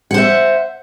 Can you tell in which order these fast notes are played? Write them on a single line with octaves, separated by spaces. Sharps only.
F#5 C5 E5